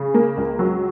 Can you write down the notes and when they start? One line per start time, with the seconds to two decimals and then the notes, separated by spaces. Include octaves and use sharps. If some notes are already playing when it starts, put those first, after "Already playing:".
Already playing: C#3 G#4
0.14 A#3
0.37 C#2
0.59 F#3